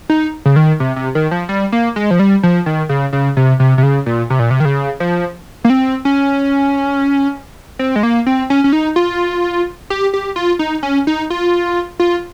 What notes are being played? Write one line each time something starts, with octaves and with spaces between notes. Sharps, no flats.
D#4
C#3
D#3
C3
C3
D#3
F3
G3
A#3
G#3
F3
G3
F3
D#3
C#3
C#3
C3
C3
C3
C#3
A#2
C3
A#2
C3
D#3
C#3
F3
A#3
C4
C#4
C4
G#3
A#3
C4
C#4
C#4
D#4
F4
G4
G4
F4
D#4
C#4
D#4
F4
F4